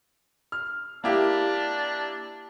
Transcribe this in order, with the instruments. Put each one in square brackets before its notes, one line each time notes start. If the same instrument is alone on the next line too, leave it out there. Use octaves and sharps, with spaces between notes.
[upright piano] F6
[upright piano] A#3 E4 G4 [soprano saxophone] D4